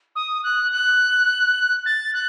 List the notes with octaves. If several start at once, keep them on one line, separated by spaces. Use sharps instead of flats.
D#6
F#6
F#6
A6
F#6